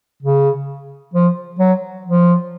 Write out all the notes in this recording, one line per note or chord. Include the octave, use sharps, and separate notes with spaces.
C#3
F3
F#3
F3